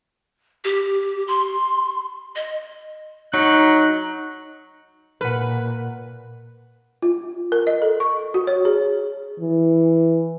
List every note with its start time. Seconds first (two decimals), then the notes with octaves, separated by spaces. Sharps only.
0.64 G4
1.28 C6
2.36 D#5
3.34 F#3 D#4 F#6
5.21 A#2 A#4 B4 F#5
7.03 F4
7.52 A#4
7.67 D#5
7.82 A4
8.00 C#6
8.34 F#4
8.47 C#5
8.65 G#4
9.40 E3